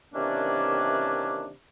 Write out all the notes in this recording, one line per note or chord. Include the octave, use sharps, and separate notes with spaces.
C3 D#3 E3 A#3 C#4 D4